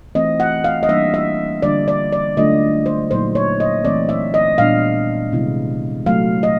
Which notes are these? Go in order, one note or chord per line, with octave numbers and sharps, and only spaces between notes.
E3 A3 C4 D#5
F#5
F5
D#5
E3 G3 A#3 D4 E5
E5
D3 G3 A#3 D4 F4 D5
D5
D5
D3 F#3 A3 D4 F4 D#5
C5
A#2 F#3 A#3 D#4 C5
C#5
D#5
E3 A3 C4 D5
E5
D#5
A#2 G3 B3 D4 F5
C3 D#3 G#3 B3 E4
F#3 A3 C4 F5
D#5